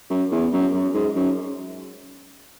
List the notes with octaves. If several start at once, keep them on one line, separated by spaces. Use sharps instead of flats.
F#2
E2
F#2
F#2
G#2
F#2